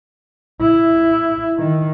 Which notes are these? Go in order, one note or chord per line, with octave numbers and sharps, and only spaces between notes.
E4
D#3